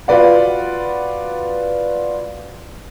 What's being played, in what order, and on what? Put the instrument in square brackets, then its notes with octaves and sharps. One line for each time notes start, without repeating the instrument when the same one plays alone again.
[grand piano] F4 F#4 B4 D5 F#5